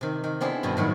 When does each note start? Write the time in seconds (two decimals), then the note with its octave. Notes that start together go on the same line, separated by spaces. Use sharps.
0.01 C3 D#3
0.24 D#3
0.41 B3 C4 D4 E4 G#4 A4
0.63 G2 B2 D3 D#3
0.77 A2 D#3 F#3